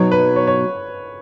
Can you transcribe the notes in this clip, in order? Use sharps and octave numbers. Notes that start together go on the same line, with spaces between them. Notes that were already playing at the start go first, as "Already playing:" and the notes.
Already playing: B2 F#3 B3 D#4 C#5
B4
C#5
C#5